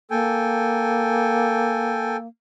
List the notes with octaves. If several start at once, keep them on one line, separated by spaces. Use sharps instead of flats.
A#3 A4 G5 G#5